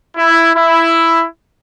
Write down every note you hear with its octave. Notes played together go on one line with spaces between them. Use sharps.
E4
E4